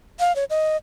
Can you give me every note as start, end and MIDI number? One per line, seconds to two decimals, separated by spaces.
0.19 0.35 77
0.36 0.44 73
0.50 0.77 75